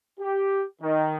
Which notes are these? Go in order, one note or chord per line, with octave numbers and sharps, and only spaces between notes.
G4
D#3